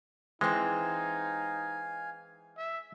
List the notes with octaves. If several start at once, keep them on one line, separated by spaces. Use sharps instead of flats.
E3 G#3 C4 D#4 F5 G#5
E5